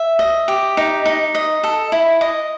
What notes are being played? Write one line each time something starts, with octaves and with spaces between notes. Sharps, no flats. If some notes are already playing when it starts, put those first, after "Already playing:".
Already playing: E5
D#5
G4
D#4
D#4
D#5
A4
E4
D#5